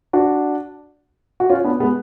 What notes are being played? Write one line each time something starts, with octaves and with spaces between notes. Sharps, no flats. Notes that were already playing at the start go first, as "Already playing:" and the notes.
D4 F#4
F#4
C#4 F4
B3 D4
G#3 B3